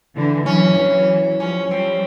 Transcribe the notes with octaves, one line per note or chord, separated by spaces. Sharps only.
D3 E3
E3 F#3 C#4
E3 F#3
F3 G3 C#4
F3 G3 C4